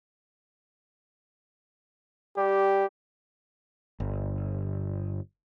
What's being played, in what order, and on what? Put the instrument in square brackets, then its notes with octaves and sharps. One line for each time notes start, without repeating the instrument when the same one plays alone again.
[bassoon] G3 [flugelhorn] G4
[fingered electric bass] G1